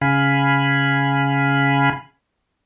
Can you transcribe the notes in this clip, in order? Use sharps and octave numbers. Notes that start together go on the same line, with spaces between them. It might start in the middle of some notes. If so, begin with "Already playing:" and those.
C#3 F5 G#5 B5